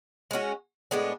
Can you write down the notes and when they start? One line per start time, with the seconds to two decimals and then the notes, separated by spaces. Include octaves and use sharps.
0.31 G#3 C#4 F#4
0.91 A2 G#3 B3 D4